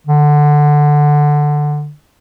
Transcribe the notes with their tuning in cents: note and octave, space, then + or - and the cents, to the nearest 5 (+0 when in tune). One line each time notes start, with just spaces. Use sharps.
D3 +10